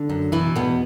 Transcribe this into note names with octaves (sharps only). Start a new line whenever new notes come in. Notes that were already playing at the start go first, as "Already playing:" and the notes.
Already playing: D3 D4
F#2
B2 E3 E4
E2 B2 B3